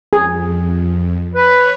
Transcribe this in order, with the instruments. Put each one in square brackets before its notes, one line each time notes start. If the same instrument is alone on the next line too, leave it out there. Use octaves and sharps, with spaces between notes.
[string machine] F2 [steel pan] G#4
[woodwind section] B4 [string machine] C#5